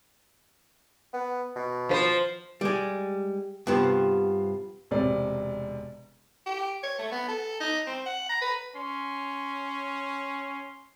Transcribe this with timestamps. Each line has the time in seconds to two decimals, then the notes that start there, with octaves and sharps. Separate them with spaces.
1.13 B3
1.56 B2
1.89 F3 B4 C5
2.61 G3 G#3
3.67 G2 C3 F3 B3
4.91 E1 C3 D5
6.46 G4
6.83 C#5
6.99 A3
7.12 B3
7.29 A4
7.60 D#4
7.87 C4
8.06 F#5
8.30 A#5
8.42 B4
8.76 C#4 C6